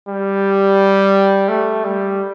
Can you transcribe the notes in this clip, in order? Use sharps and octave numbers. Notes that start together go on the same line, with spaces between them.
G3
A3
G3